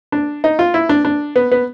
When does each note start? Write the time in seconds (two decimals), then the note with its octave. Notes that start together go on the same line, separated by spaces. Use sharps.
0.12 D4
0.44 D#4
0.59 F4
0.74 E4
0.89 D4
1.05 D4
1.36 B3
1.52 B3